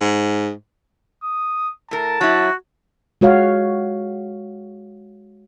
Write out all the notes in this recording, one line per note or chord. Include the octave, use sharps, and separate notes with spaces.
G#2
D#6
A2 A#4 A5
F#3 E4 F#4
G#3 F#4 C#5 F5